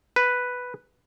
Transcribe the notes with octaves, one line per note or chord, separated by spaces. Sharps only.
B4